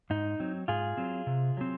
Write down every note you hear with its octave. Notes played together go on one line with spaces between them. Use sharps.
G#2 D#4
F#3 C4
G#2 F4 G#4
F#3 C4
C3
F#3 C4